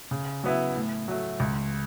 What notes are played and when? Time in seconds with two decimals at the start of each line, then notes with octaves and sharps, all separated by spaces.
0.11 C#3
0.44 F#3 B3 E4
0.76 A2
1.08 F#3 A3
1.40 C#2